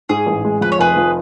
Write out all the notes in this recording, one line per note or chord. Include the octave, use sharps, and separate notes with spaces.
G#2 G#4
A1
G#3
F2 B4
C#5
F1 G#4 B4
F3